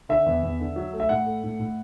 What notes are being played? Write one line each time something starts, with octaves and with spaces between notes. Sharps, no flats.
D3 E5
E2
E2
D3
F#3
A3
E5
A2 F#5
A3
A2
A2